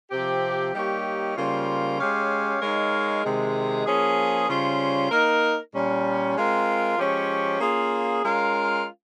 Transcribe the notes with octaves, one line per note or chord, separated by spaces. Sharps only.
C3 F3 C4 G4
G3 A#3 D#4 G4 C#5
C#3 G3 A#3 F4 C5
G#3 C#4 G4 C#5 F5
G#3 D#4 A#4 C#5 F5
C3 D#3 G#3
F3 A#3 C#4 G#4
C#3 G3 C#4 F4 C5
A#3 D#4 A#4
A#2 G3 C#4
G#3 C4 F4 A#4
F3 G#3 C#4 G4 C#5
A#3 C#4 F4 G#4
G#3 C#4 F4 A#4 F5